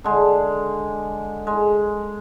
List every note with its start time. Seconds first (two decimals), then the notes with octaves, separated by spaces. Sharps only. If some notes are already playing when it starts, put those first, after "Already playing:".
0.04 D3 G#3
1.47 G#3